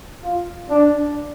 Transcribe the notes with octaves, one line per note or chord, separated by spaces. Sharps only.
F4
D4